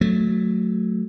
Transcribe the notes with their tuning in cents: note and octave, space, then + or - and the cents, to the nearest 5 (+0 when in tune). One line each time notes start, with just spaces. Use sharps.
F#3 +0 A3 +0